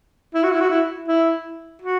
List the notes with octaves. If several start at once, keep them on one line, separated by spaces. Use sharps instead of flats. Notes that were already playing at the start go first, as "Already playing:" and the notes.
E4
F#4
E4
F#4
E4
E4
F#4